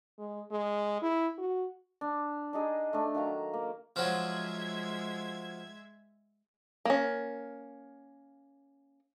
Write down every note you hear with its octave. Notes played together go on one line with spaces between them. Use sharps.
G#3
G#3
E4
F#4
D4
D4 D#4 G#4 D#5
A3 D4
D#3 F#3 F5 A#5
A#3
F3 F#3 G#3 E5 G#6
A#3 C#4